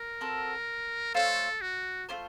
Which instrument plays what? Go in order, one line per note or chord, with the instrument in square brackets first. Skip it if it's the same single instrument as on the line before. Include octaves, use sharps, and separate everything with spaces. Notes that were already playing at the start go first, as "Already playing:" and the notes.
Already playing: [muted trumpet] A#4
[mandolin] C4 F#4 A4
[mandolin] A3 C#4 F4 C5 [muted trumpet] A4
[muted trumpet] F#4
[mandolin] A3 C#4 F4 C5